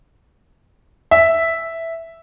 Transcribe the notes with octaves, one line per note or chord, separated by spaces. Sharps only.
E5